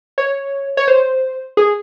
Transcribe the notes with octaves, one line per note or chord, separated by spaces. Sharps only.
C#5
C#5
C5
G#4